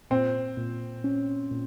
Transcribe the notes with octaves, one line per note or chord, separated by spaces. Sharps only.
A#2 C4
A#2
C#4
A#2